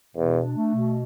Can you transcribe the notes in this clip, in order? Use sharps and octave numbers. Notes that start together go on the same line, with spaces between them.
E2 B2
D4
A3
B2